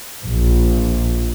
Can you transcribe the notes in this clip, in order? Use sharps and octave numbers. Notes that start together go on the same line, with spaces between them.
A#1